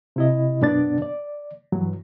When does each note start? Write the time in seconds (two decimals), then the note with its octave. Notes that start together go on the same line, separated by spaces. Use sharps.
0.16 C3 E4 D#5
0.62 F#2 B2 B3 D4 D5 A6
1.02 D5
1.72 G2 E3 F#3